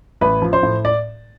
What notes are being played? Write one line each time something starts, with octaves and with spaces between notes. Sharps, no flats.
A1 B4
F3
C5
A2
D5